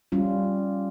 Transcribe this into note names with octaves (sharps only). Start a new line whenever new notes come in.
G3 C#4 F4